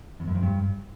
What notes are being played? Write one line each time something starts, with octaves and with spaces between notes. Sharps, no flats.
E2
F#2
F2
G2